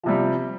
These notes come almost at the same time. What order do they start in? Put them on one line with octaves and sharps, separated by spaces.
F3 C3 G3